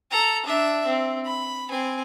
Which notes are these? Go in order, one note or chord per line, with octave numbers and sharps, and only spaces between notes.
A4 A#5
D4 E5
C4
B5
C4 G#5